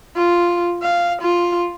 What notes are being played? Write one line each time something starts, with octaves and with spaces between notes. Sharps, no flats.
F4
F5
F4